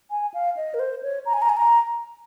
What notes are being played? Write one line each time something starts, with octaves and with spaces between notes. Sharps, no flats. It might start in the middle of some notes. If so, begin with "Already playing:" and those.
G#5
F5
D#5
A#4
C5
C#5
A#5
G#5
A#5
G#5
A#5